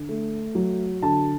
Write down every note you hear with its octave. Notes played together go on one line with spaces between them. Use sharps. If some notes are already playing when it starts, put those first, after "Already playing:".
Already playing: D3
A3
F#3
D3 A5